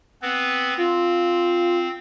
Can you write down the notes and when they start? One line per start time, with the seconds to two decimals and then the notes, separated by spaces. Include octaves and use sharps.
0.22 B3 C4 B4
0.78 C4 F4